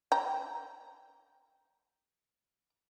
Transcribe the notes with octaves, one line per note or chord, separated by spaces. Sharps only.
G5 A#5